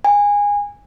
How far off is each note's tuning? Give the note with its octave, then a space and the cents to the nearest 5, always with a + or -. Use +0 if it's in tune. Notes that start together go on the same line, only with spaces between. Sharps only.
G#5 -20